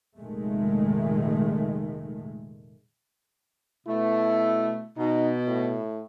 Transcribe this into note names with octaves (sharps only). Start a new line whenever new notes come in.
F1 A#2 D#3 G#3 A3
B2 A3 E4
B2 D#4
A2